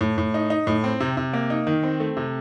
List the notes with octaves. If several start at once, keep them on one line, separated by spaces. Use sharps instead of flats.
A2
A2
D#4
D#4
A2
C4
C3
C3
A#3
D#4
D#3
C4
A3
C3